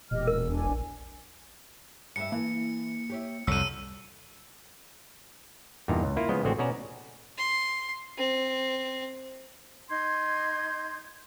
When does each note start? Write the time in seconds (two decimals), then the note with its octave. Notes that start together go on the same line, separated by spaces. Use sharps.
0.11 E1 A#2 G4 D#5 F6
0.27 A#4 E6
0.49 E2 D4 G#5
0.65 A#1
2.16 G2 G3 E5 C#7
2.32 E3 A#3
3.09 G4 C#5 E5
3.47 C2 F2 F#3 G3 A4 E6 D#7
5.88 E2 G2 A#2 D#4 A#5
6.04 C#2
6.17 A#3 E4 F4
6.29 C#3 F3 G#3 B3 D#5
6.43 A1 D3 G#3 C4 F#4
6.58 B2 C#4 F#4 D5 A#5
7.38 C6
8.17 C4
9.90 D#4 C6 G6 G#6